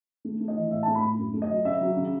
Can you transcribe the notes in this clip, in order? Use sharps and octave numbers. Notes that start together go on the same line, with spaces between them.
A3
A3
D#5
E3
A2 E5
A3 A5
B5
A2
F#2
A3
D#5
F#3
C#3 E5
F#3
C#3